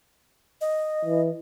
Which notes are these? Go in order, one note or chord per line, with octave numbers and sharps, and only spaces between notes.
D#5
E3